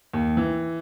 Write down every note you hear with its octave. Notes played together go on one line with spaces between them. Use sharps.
D#2
E3